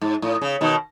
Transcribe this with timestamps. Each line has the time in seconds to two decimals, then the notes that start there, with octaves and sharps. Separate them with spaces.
0.01 G#2
0.22 A2
0.41 C#3
0.61 B2 D#3